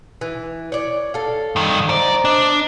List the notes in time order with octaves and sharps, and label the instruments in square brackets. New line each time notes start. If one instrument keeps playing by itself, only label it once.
[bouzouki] E3
C#5 D5
A4 F5
[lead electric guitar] G2 D#3
[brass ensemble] C5 A#5 [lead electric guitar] D5
[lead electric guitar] D4 [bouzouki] D#5